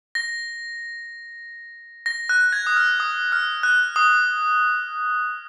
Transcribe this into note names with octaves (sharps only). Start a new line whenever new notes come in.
A#6
A#6
F#6
G#6
D#6
F6
D#6
F6
F#6
D#6